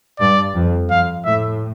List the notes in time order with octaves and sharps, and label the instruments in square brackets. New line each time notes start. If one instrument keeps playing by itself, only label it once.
[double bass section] G2 [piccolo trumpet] D5
[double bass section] F2
[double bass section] F2 [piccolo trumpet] F5
[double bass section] A2 [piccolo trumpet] E5